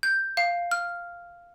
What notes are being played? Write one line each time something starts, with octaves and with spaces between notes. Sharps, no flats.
G6
F5
F6